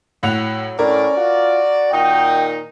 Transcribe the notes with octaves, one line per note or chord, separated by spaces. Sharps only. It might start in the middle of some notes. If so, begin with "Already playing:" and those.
A2 F#3 F#5 F7
A2 C#4 A#4 D5
F4 F#4
A#2 D#3 D#4 G5